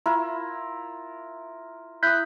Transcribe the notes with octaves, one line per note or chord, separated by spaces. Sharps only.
E4 F4 A#4
E4 D#6 F#6 G6 B6